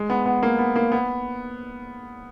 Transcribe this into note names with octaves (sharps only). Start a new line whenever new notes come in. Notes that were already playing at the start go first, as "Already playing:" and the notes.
Already playing: G#3
B3
B3
A#3
B3
A#3
B3